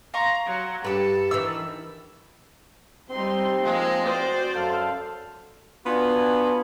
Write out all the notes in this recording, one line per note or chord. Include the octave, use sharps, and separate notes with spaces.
F5 A#5 C6 C#6
F#3
G2 G4 A4 B4
D#3 E3 E6
G3 C4 D#4 C6
F3 G#3 A#3
F#4 C5 D5
F#2 A4 F5
B3 D4 F4 F#4 G#5